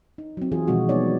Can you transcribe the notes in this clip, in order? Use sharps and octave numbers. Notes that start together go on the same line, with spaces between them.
D#4
F#3 C4
E3 F4 G#4
B2 D#3 F3 G#3 C4 F#4
G3 B3 D#4 C#5 D5